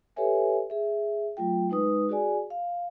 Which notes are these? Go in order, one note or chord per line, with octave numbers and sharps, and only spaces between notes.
G4 A4 B4 C#5 E5 G#5
G#4 E5
F#3 A3 F4 G5
G#3 D#4 B4 D#6
F#4 G#4 D5 G#5
F5